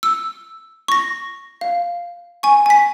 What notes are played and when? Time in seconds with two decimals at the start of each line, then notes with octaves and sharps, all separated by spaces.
0.03 E6
0.88 C#6 A#6
1.61 F5
2.43 G#5 C#6
2.66 G#5 B6